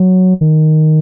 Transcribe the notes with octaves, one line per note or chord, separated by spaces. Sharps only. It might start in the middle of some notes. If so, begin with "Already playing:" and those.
Already playing: F#3
D#3